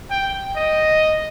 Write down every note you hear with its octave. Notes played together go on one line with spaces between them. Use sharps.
G5
D#5